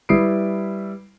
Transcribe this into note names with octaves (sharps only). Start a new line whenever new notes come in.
G3 E4 B4 D#6 C7 D7